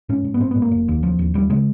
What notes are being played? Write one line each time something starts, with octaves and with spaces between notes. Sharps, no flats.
G#2 C#4
G#2
B3
G#2 C4
B3
G#2
A#3
F1
D#2
D#2 F3
D#2
D#2 G3
C#3 G#3